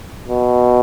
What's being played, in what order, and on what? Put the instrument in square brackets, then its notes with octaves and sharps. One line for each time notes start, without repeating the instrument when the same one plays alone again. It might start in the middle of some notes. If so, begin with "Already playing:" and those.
[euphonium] B2